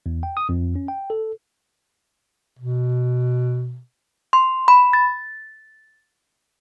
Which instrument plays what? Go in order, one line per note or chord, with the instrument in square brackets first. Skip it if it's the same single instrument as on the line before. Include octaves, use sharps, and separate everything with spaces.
[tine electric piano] E2
G5
D#6
F2
C#4
G5
A4
[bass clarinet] B2
[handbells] C6
B5
A6